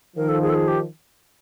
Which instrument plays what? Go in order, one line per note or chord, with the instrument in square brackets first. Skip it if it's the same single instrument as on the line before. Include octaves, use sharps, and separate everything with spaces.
[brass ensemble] D#3 F3 [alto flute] A#4
[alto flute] A4
G#4
A4
G#4
G4